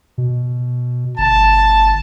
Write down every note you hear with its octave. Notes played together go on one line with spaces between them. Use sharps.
B2
G1 A5